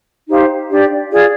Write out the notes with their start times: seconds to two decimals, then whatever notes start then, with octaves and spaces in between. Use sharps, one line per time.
0.28 D#4 G4 C5 F5
0.70 D4 G4 D5
1.12 F4 G#4 D5